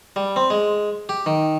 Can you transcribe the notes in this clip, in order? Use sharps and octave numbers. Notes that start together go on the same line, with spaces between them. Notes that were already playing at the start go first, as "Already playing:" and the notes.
G3
C4
G#3
G4
D#3